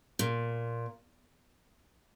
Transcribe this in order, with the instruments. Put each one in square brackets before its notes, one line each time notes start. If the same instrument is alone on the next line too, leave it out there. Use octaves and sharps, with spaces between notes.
[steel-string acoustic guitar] A#2